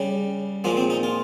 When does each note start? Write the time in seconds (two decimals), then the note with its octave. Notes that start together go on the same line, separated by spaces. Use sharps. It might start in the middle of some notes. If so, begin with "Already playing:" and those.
Already playing: C#3 G3
0.64 A#2 F3 G#3 A#3
0.77 C4
0.90 D#4
1.03 F4